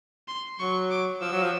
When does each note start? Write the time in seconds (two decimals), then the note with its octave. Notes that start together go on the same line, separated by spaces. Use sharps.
0.28 C6
0.59 F#3 C#6
0.91 D6
1.21 F3 E6
1.32 F#3
1.43 F3